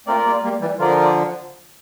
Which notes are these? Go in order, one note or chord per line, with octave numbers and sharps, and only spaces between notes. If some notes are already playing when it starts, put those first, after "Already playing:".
A3 C4 F4 A#4 D5
G3 A#3
G3 A#3
E3 G3
D3 F3 F4 A#4 D5